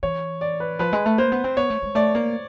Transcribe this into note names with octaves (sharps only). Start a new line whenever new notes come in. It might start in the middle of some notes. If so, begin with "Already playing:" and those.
E3 C#5
D5
B4
F3 B4
G#3
A3
A#3 C5
B3
C4
B3 C#5
A3
G#3
A3 D5
A#3